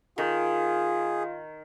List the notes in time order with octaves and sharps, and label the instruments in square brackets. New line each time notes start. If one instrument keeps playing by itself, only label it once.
[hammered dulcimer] D#3 [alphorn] F4 [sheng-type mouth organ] G#4